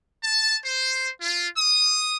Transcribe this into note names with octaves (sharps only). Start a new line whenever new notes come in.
A5
C5
F4
D#6